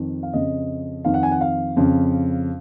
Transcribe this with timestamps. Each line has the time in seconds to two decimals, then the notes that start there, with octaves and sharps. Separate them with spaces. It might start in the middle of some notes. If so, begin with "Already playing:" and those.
Already playing: F2 D#3
0.23 F5
0.33 F2 C#3 D#5
1.05 F2 D#3 F5
1.14 F#5
1.23 G#5
1.31 F#5
1.41 F5
1.77 F2 C#3